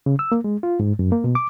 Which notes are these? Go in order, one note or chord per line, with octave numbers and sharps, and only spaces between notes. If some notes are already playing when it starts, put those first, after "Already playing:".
C#3
E6
A#3
G#3
F4
G#2
F#2
A#3
B2
D6